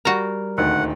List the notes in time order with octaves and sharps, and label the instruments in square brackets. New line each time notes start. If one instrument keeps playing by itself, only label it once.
[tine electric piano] G3 A#4 [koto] F#4 A#5
[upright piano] D#1 D2 D#3 [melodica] F#5